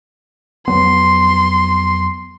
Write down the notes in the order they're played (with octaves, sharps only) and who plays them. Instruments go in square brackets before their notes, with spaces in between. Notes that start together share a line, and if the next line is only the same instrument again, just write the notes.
[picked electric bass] F2 F#3 B3 [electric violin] C6